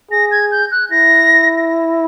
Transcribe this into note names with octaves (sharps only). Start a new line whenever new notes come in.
G#4 A#6
G#6
G6
F#6
E4 A#6